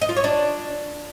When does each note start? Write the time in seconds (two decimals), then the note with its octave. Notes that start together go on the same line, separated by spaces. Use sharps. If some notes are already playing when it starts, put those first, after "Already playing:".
0.02 D#5
0.09 F4
0.16 C#5
0.24 D4